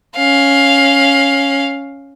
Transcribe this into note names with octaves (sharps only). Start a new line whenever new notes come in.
C#4 F5